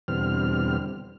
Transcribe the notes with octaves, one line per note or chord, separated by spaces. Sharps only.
E2 B2 D3 G3 C4 F6